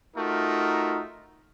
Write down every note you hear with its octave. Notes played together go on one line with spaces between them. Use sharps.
A3 D#4 F4 F#4 A#4